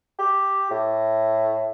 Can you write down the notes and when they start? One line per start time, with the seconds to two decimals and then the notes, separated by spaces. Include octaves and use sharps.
0.19 G4
0.71 A2